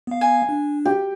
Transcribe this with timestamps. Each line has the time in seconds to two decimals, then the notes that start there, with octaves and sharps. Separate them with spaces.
0.07 B3 F5
0.21 G#5
0.49 D4
0.85 G4